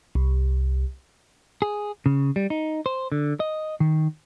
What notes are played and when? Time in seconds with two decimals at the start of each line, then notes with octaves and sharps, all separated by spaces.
0.15 C2
1.62 G#4
2.06 C#3
2.36 G3
2.50 D#4
2.86 C5
3.12 D3
3.40 D#5
3.80 D#3